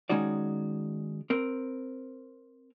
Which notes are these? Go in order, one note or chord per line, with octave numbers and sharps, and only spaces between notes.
D#3 G#3 C#4 D#4 F#4 D5
C4 A#4